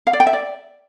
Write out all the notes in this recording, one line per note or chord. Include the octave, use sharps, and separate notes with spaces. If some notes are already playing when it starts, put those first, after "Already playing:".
F5
D5
G5
E5
D5